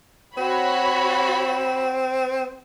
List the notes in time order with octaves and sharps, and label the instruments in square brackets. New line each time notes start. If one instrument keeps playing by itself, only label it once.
[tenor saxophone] C4 [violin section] F#4 C#5 B5